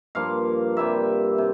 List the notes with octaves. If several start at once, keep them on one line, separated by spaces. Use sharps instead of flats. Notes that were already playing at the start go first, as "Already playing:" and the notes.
G2 F3 A#3 F5
C3 G3 A#3 E5
C3